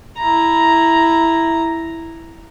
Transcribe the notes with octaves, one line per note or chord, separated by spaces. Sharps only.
E4 A#5